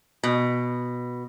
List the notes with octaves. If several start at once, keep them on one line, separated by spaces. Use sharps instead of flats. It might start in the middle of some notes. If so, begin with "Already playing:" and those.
B2